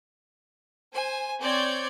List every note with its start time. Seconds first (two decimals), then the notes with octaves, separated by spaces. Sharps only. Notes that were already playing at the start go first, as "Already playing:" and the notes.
0.94 C5 G#5
1.40 C4 C#5 D5 G6 G#6